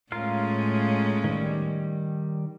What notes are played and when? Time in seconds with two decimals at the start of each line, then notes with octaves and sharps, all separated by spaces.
0.12 A2 G#3 C#4 F4 A#4 F5
1.24 D#3 G3